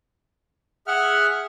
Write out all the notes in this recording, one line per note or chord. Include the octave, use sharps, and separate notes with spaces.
G#4 E5 F#5 F6